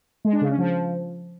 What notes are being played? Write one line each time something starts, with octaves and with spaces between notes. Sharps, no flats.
G#3
D4
C#3
C#4
F3